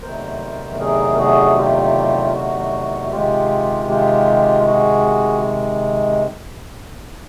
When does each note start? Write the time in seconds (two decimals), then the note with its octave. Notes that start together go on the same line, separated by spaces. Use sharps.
0.02 E2 C3 D#3 F#3 A3 A#4 C5
0.79 G#4 A#4
1.19 F#4 G#4
1.57 F4 G4
2.35 F#4
3.12 C3 D#3 G#3 F4 G4
3.89 F4 G4
4.67 F#4 G#4